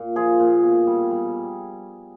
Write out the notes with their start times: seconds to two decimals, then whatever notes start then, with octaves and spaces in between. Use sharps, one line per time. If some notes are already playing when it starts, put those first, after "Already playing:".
Already playing: A#2
0.16 F3 G#4
0.40 A#2
0.63 B2
0.87 G3
1.11 G3